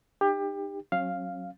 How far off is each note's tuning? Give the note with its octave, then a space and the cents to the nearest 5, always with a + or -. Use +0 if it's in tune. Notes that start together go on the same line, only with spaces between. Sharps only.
D#4 -35 G4 +25
F#3 +0 C#4 -35 F5 +0